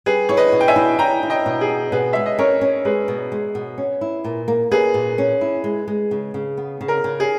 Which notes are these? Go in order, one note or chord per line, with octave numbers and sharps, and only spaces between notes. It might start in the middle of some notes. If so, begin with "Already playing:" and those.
G3 G#4 B4
E4 C#5
B4 D#5
B2
G5
E5 G#5
E4
E4 G5 A#5
E4
D#5 G5
B2
G#4
B3
B2 G#4 B4
G#3 E5
D#5
C#4 A#4 C#5
C#4
G#3 G#4 B4
B2
G#3
B2
C#4
E4
A#2
A#3
A#3 G#4 B4
A#2
C#4
E4
G#3
G#3
C#3
C#3
B3
C#3
A#4
C#3
G#4